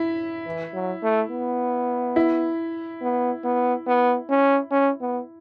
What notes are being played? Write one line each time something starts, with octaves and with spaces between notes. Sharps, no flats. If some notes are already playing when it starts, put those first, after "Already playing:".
Already playing: E4
E3
F#3
A3
B3
E4
B3
B3
B3
C#4
C#4
B3